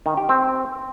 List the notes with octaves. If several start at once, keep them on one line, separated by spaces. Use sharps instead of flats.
D#3
G4
C4